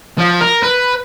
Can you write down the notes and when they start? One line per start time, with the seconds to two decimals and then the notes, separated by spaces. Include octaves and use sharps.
0.18 F3
0.41 A#4
0.63 B4